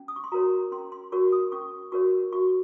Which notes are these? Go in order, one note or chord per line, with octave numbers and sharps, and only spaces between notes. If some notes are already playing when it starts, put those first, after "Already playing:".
Already playing: C#4
D#6
C#6
C6
F#4 A#4 C#5 A#5
C#4 C6
C6
F#4 A#4 C#5 C#6
D#6
C#4 C#6
F#4 A#4 C#5 C#6
F#4 C#6